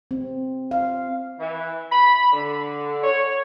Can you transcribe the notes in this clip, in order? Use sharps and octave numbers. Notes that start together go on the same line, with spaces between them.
C4
F5
E3
B5
D3
C#5